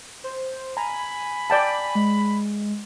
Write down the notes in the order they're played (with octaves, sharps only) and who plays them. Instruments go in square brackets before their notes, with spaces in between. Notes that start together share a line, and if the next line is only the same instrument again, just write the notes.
[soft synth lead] C5
[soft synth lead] G#5 [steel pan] A#5 [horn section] B5
[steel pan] D5 G5 A5
[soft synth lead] G#3